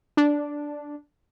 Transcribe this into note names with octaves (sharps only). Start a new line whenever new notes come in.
D4